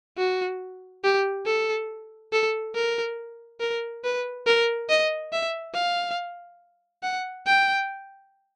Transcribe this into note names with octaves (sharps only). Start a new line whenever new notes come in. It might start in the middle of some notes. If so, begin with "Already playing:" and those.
F#4
G4
A4
A4
A#4
A#4
B4
A#4
D#5
E5
F5
F#5
G5